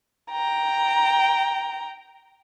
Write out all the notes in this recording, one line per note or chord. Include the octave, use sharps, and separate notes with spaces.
G5 A#5